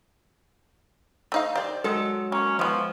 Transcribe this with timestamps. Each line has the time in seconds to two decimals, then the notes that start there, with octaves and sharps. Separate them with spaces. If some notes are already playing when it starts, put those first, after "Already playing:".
1.32 A3 D#4 F5
1.56 G4 C5 D5
1.84 F#3 G#3 A4
2.32 A#3 C#4
2.59 F3 G#3 B3 E4